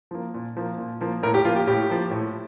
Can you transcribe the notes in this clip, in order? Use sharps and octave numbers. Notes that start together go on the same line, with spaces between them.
F3 A#3
A#2
F3 A#3
A#2
F3 A#3
A2 A#4
G4
F3 A#3 F4
G4
A2 G4
F3 A#3
A2